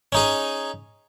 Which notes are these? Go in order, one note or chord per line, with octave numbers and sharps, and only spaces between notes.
C#4 D#4 G#4